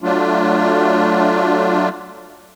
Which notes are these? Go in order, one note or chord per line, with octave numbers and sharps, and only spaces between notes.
F#3 A3 D4 F4